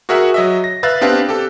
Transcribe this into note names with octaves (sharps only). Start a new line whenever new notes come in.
F#4 G#4 A#4 E5 F#5
F#3 D#5 E5
A#6
B4 E5 F5 F#6 A6
B3 C4 D4 G4 B4 F5
G4 A4